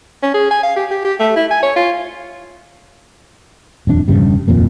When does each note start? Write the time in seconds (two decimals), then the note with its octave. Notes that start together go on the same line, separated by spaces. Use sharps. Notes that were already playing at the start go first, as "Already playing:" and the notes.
0.22 C#4
0.34 G#4
0.51 G#5
0.63 F5
0.76 G4
0.91 G4
1.05 G4
1.20 A3
1.36 E4
1.51 G#5
1.63 C#5
1.76 F4
3.87 D#1 F2 F3 D4
4.08 E1 G2 C#3 G3
4.48 D#1 F2 A#2 A#3